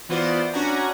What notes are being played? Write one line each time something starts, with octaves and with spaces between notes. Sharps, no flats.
E3 B3 F4 F#4 C5 D5
C#4 D4 F#4 F#5 G#5 A#5